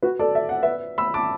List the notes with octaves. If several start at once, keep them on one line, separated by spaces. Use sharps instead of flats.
F#4 B4
A4 D5
E5
F#5
B4 E5
B5 E6
A5 D6